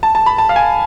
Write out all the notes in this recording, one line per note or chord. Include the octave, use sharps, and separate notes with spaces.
A5
A5
B5
A5
F5
G#5